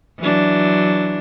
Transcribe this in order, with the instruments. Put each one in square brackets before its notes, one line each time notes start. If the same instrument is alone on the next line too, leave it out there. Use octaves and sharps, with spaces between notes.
[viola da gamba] E3 F#3 D4